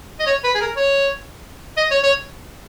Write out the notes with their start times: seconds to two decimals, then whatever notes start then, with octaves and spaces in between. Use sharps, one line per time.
0.20 D#5
0.26 C#5
0.44 B4
0.55 G#4
0.61 A#4
0.77 C#5
1.77 D#5
1.91 C#5
2.03 C#5